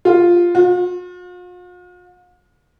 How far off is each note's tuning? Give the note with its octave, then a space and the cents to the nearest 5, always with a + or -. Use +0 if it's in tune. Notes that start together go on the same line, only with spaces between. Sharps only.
F4 +0
F4 +45